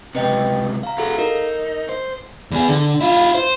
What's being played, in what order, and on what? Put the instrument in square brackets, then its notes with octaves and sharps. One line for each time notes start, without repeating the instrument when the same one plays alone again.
[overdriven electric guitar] C#2 C3 [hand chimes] B4 D#5 G5
[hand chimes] F5 A#5
[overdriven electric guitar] E4 F#4 [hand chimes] G#4 A4 F5
[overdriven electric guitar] D#4 [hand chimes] A#4
[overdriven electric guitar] C5
[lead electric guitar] E2 G#4
D3
E4 F4
C5